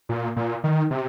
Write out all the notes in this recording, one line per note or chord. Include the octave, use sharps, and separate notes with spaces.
A#2
A#2
D#3
C3